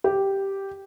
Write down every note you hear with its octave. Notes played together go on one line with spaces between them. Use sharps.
G4